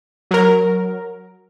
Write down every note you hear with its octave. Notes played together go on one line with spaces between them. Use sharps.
F#3 A#4